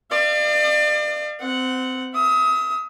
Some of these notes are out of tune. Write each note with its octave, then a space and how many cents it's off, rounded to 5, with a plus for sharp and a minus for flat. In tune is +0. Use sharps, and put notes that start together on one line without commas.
D5 +35 F5 -25
C4 -20 F#5 +0
E5 +30 D#6 +30